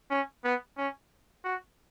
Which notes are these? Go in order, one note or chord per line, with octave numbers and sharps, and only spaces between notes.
C#4
B3
C#4
F#4